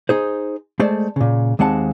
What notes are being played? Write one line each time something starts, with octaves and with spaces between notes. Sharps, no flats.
D#4 G#4 C5
G#3 A3 C5 D5
A#2 C#3
D#2 G#3 C4 F#5 A5